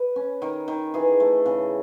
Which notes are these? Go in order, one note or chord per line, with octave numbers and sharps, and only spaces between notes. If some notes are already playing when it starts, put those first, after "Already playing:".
Already playing: B4
C#4
D#3
D#3
E3 G#4
A3
C#3